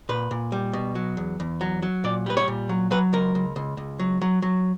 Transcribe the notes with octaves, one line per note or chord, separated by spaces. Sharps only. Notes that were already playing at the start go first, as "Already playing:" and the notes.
A#2 B4
A#2
G3
B2
F#3
E2
E2
F#3
F#3
A#2 D5
G3 B4
C#5
A#2
F#3
F#3 B4
C#2 A#4
C#2
C#2
C#2
F#3
F#3
F#3